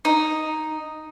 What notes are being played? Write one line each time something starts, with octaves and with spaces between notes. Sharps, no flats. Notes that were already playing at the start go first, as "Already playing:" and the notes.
D#4